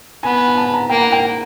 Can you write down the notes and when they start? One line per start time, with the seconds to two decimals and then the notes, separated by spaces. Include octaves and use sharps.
0.23 B3 G#5
0.48 G#5
0.57 A5
0.74 A#5
0.90 A#3 G5
1.01 F#5
1.12 G5